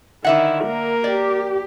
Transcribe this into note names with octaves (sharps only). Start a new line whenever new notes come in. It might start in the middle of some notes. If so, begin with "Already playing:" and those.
D3 D#3 E4 E5 F#5
A#3 A#4
G4 D5